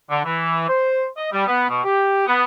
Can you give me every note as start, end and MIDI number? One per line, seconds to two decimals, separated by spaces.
0.10 0.20 50
0.25 0.65 52
0.69 1.06 72
1.17 1.29 75
1.33 1.46 55
1.47 1.66 59
1.69 1.81 47
1.84 2.24 67
2.27 2.44 59